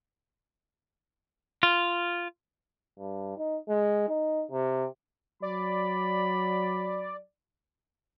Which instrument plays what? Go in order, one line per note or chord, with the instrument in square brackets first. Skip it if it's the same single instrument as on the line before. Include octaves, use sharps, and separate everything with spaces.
[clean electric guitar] F4
[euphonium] G2
D#4
G#3
D#4
C3
[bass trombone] F#3 [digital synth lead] D5 [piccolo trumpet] B5